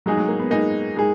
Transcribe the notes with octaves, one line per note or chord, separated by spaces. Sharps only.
F#3 G#3 D#4 G#4
F#3
A#3
B3
G#3 A#3 D#4 G#4
G#3 D#4 G#4